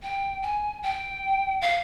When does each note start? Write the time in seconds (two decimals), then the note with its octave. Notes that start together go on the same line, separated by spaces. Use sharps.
0.03 G5
0.42 G#5
0.83 G5
1.62 F5